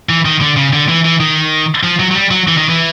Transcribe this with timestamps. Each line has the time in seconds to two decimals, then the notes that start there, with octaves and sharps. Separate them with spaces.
0.09 E3
0.25 D#3
0.41 D3
0.56 C#3
0.73 D3
0.89 E3
1.05 E3
1.20 D#3
1.83 F3
2.00 F#3
2.11 F#3
2.15 G3
2.31 F#3
2.48 E3
2.57 D#3
2.69 E3